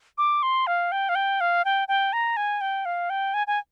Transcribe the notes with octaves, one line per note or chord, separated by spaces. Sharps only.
D6
C6
F5
G5
F5
G5
F5
G5
G5
A#5
G#5
G5
F5
G5
G#5
G#5